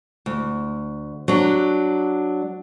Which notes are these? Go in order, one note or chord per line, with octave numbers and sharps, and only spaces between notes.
D2
F#3 D4